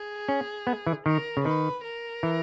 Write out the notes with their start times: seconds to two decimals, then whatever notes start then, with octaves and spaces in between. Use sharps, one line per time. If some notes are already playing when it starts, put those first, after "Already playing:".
Already playing: G#4
0.28 C#4
0.67 B3
0.87 E3
1.06 D#3 A#4
1.37 C#3
1.45 D#3 B4
1.84 A#4
2.23 E3